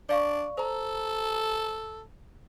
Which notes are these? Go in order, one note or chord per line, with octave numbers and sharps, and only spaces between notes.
D4 D5 F5 C#6
A4 C5 A#5